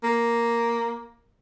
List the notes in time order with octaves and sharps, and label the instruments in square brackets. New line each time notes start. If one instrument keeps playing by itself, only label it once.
[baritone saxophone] A#3